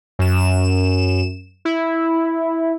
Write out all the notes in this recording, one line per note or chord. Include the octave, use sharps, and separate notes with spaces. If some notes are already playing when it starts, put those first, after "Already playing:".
F#2 E7
E4